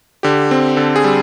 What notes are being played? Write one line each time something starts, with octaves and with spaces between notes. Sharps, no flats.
D3 G4
C4
D3 A4
G#4
G3